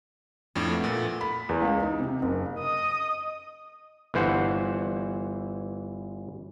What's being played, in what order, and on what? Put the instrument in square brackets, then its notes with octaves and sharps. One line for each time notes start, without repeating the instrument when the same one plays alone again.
[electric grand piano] F2 A2 [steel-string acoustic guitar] D4
[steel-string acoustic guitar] A3 B3
[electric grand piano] A#2
[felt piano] B5
E2
C#2
D#4
C3
F#1
[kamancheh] D#5 D#6
[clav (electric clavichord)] G1 E3 C5 F#5